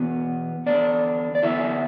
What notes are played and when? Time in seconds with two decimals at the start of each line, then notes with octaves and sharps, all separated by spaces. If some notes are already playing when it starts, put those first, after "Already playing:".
Already playing: E2 B2 B3
0.66 E2 D3 B3 D4 D5
1.35 D5
1.43 E2 D3 B3 E4 E5